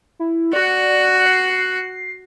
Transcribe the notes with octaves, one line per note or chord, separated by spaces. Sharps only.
E4
F#4 D5 F#5
C7